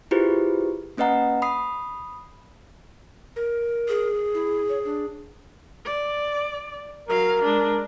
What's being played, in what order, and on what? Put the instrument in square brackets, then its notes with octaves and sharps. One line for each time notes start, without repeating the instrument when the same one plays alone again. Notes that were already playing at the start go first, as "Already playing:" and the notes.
[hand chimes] E4 F4 G4 G#4 B4 C5
A#3 C#4 B4 D#5 F#5 A#5
B5 D#6 C7
[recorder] A#4
[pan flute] G#4
[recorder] E4
C#5
D4
[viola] D5
[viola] F#3 F5 [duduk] A#4
[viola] G#3 D4